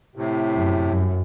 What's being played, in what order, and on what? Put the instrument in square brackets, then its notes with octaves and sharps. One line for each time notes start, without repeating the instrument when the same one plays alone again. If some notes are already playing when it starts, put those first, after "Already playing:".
[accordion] A2 C3
[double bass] F#2
F#2